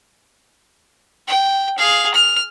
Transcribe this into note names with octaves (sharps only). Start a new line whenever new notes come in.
G5
G#4 F5
F6